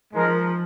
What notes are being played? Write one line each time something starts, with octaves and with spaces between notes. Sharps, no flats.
F3 G#3 D#4 A#4 D#5